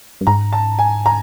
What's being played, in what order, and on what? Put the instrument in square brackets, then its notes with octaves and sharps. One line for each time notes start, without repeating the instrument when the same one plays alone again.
[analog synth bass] G2
[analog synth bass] G#2 [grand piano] A#5
[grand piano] A5
G#5
A#5